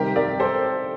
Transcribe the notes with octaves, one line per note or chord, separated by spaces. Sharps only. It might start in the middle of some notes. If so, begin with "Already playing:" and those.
Already playing: C3 D#3 G3 C4 G4 A#4
A#4 D5
A4 C5